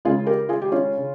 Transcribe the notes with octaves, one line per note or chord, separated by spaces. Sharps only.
C#2 C#3 F4 G#4
G4 A#4
F4 G#4
G4
C#4 F4
C#3